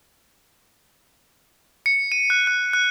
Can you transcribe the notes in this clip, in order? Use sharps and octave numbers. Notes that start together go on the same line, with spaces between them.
C#7
D#7
F#6
F#6
F#6